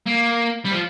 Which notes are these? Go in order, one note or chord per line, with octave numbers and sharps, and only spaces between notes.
A#3
G3
F3